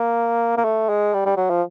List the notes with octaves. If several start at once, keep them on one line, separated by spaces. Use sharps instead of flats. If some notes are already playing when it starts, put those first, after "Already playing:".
Already playing: A#3
A#3
A3
G#3
G3
G3
F#3
F3